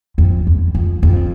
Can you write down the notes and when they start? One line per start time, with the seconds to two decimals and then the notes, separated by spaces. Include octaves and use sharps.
0.18 F2
0.47 E2
0.75 F2
1.03 F2